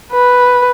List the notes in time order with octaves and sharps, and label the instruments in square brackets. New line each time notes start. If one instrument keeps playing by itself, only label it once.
[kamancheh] B4